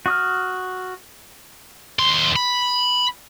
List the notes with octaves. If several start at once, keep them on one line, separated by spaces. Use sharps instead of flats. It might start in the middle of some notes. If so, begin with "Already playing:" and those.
F#4 D#6 F6
D#2 C6
B5